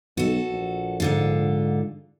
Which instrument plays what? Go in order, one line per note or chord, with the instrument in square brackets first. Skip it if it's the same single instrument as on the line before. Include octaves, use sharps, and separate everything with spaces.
[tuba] B1 [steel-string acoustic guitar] F#4 A4
[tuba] A#1
[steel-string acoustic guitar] G#2 D3 F4